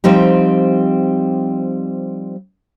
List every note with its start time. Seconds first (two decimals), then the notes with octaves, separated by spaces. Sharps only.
0.04 F3 G3 C4 D#4 G4